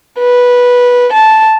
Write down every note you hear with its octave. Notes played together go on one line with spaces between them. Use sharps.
B4
A5